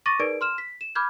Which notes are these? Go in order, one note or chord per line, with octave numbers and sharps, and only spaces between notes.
C#6 D6 A6 A#6 D#7
D#4 G#4 A#4 B4 D5 D7
C6 F6 E7
B6
E7
B5 D6 F6 G6 G#6